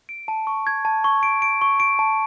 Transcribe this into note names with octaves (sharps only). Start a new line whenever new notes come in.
D7
A5
C#6
G#6
A5
C#6
D7
D7
C#6
D7
A5